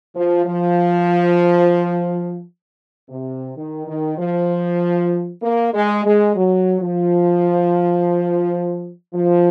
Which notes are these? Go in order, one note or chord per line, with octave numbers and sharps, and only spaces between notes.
F3
F3
C3
D#3
D#3
F3
A#3
G#3
G#3
F#3
F3
F3